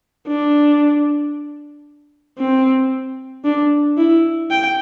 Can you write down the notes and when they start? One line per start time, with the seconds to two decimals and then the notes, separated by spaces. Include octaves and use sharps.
0.27 D4
2.38 C4
3.44 D4
3.97 E4
4.50 G5